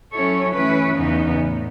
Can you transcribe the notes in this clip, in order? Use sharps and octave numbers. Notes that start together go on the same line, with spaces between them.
F#3 C#4 E4 A4 C#5
E3 A3 C#4 E4 B4
E2 C#3 E3 B3 D#4
A2